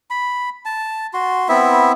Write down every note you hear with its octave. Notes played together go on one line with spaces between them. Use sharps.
B5
A5
F#4 C6
B3 C4 E4 E5